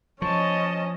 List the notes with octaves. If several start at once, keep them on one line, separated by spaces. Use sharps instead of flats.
F3 C#4 D#5 A5 C#6